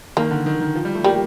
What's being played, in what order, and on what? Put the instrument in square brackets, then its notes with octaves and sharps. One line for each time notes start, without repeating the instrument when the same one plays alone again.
[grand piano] D#3 [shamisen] A#3
[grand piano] D3
D#3
D#3
F3
G3
A3
[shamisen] G3 [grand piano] A#3